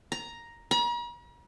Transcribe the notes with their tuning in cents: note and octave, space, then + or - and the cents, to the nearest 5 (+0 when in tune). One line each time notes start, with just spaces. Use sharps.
A#5 +5
A#5 +45